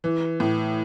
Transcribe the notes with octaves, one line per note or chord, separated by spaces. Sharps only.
E3
A2